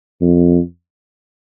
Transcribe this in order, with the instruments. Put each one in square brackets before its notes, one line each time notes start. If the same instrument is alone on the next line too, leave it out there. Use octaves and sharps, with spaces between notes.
[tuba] F2